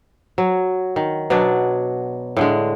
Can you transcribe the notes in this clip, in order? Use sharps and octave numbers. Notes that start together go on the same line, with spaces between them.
F#3
D#3
B2 F#3 D4 D5
A2 D3 G#3